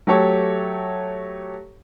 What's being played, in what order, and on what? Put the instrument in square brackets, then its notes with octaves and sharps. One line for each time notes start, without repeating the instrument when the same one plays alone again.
[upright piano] F#3 A3 G4 A4 C#5